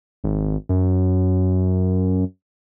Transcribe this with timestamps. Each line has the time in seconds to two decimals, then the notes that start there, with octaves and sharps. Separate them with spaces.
0.24 G#1
0.69 F#2